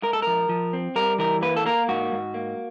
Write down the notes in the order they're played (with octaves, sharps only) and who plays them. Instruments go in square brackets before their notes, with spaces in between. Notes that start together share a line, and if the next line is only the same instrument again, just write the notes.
[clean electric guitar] G#3 A#4
A4
F3 A#4
F3
C4
G3 A#4
E3 A#4
A#3 B4
A4
A#3 A#4
G#2 F#4
G#2
A#3